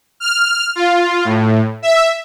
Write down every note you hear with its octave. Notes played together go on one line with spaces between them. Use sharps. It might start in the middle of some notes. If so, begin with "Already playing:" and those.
F6
F4
A2
E5